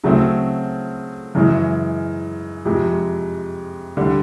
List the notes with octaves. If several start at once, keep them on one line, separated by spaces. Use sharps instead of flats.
C#3 F#3 A3 C4
F#2 C#3 E3 G#3
F2 C3 F3 G#3
D3 G3